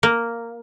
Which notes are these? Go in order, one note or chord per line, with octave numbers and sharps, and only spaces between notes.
A#3